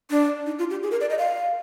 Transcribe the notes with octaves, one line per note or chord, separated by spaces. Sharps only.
D4
D#4
F4
G4
G#4
A#4
D5
D#5
F5